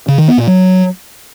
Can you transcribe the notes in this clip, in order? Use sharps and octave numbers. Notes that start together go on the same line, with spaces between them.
C#3
D#3
B3
A#2
F#3